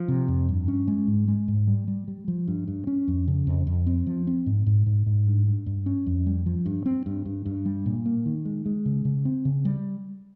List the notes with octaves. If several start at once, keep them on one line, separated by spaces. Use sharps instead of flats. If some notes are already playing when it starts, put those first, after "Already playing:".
Already playing: F3
C3
F2
G2
C#4
G#3
G#2
G#3
G#2
G3
G3
G3
F3
G2
G2
C#4
F2
C#3
F2
F2
C4
F3
C4
G#2
G#2
G#2
G#2
G2
G2
G2
C#4
F2
G3
F3
G2
C4
G2
G2
G2
G3
A#2
A#3
D#3
G#3
G#3
C#3
C#3
C4
C#3
G3